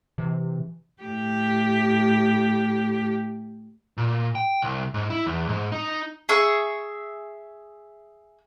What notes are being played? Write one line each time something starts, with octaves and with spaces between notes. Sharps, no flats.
C3 E3
A2 G4
A#2
G5
C2
G#2
E4
E2
G#2
D#4
G#4 E5 C#6